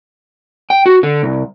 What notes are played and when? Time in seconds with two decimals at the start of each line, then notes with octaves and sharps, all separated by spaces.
0.70 G5
0.86 F#4
1.03 D3
1.23 C2